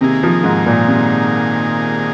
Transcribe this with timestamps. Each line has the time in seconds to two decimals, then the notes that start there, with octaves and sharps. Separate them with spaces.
0.01 C3 D#3 A#3 G#4
0.23 F3
0.44 G#2
0.66 A#2
0.87 C3